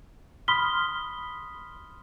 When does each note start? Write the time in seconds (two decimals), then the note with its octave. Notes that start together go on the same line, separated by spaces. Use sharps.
0.48 B5 C6 D#6 F6 B6 G7